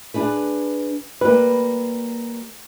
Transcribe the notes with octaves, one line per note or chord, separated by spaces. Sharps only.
D4 G#4 B4
G3 A#3 B4